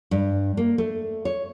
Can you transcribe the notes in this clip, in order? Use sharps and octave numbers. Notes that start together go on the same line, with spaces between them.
G2
A#3
A3
C#5